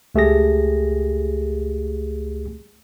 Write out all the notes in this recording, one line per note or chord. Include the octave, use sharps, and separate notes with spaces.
C#2 A3 G4 G#4 A#6